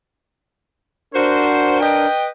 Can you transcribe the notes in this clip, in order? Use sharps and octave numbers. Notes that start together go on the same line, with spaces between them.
D4 F#4 A#4 C5
B4 D#5 G5